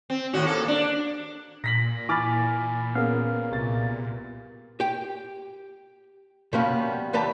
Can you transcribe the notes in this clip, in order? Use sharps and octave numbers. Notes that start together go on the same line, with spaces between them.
C4
D#2 A2 F#4
A#3 A4
D4
A#2 A#6 B6 F#7
E3 G#5 B5 D6 F6 A6
B3 C#4 G#4 A#4 F5
C2 A6
G4 G5
B2 F3 G3 A#3 B3 C#4
D#2 E3 B4 D5 A5 A#5